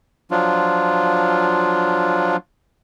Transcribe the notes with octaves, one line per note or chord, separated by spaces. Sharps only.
F3 F#3 D4 F4